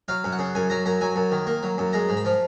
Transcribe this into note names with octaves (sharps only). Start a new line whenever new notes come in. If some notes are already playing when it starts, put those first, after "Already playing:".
F#3 F5
F#2
F#5
C#3
F#2 G#5
F#3 A#5
F#2 A#5
F#3 G#5
F#2
D#3
A#3
F#3
F#2
G#3 A#5
G#2
B5
F3